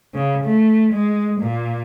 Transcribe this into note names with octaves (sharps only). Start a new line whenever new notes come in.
C#3
A3
G#3
A#2